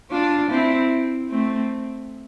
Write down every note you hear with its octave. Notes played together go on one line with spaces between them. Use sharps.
D4 F4
C4 E4
A3 C4